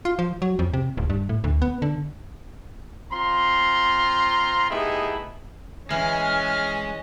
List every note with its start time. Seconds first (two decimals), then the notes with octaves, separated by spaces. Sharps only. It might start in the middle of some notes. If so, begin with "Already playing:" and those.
0.05 F4
0.19 F3
0.42 F#3
0.59 F2
0.74 C3
0.97 D1
1.10 G2
1.29 A2
1.44 D2
1.62 B3
1.82 D3
3.13 C4 F4 A#5 C6
4.71 A3 B3 D#4 E4 G4 G#4
5.90 E3 G#3 C#4 D#5 F6